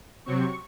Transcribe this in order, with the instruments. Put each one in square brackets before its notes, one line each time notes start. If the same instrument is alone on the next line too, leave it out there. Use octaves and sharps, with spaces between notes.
[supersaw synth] C3 F#3 C4 C#6